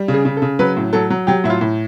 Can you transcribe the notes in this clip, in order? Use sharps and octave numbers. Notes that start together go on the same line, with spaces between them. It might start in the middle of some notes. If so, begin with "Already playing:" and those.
Already playing: G3
C#3
G#4
C#3
A4
C#3
F#3 B4
A2
F#3 A4
F#3
F#3 G4
A2 E4
F4
A2